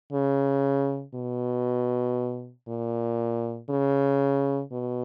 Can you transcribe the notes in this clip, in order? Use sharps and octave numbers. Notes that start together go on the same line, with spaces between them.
C#3
B2
A#2
C#3
B2